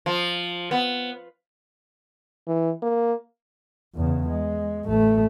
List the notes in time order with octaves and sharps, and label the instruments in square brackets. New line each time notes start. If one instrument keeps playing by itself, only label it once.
[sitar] F3
B3
[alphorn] E3
A#3
[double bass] E2 C#3
G#3
A1 A3